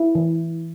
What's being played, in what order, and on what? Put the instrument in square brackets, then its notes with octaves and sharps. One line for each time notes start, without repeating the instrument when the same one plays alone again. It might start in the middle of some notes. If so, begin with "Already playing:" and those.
Already playing: [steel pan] E4
E3